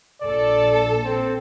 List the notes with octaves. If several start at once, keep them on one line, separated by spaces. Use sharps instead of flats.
A#1 A4 D5
C4